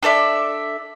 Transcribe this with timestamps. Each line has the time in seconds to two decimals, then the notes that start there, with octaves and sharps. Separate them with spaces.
0.03 D4 A4 D5 E5